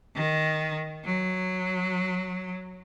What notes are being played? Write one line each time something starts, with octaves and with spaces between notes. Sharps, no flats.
D#3
F#3